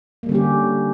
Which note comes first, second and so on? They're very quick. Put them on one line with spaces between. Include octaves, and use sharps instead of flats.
A#3 G3 D3 C#4 G4